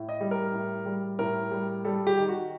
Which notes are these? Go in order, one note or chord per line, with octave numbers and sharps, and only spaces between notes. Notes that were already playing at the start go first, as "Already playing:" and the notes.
Already playing: A2
D#5
G3
A#4
A2
G3
A2 A#4
G3
G3 A4
G4
D#3
F#4